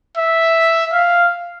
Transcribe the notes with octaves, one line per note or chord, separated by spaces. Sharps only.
E5
F5